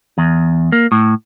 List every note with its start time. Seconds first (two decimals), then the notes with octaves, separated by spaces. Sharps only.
0.18 E2
0.72 A#3
0.92 A2